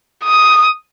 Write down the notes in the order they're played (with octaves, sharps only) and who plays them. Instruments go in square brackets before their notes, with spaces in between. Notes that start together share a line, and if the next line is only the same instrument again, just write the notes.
[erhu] D#6